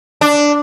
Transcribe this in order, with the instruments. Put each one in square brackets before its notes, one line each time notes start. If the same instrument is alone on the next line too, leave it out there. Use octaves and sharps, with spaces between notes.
[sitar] D4